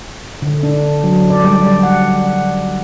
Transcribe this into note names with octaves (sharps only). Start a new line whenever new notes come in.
D3
D4
F#3
D5
G3
F#5